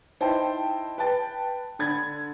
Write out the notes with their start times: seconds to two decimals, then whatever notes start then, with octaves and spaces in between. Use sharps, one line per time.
0.21 D#4 E4 C5 G5 A5
0.98 B4 G5 A5 A6
1.79 D3 B5 G#6 A6